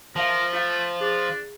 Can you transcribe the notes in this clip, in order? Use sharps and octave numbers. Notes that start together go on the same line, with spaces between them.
F3 A#4 E5 F5 A5
A3 F4 F5
D4 G#4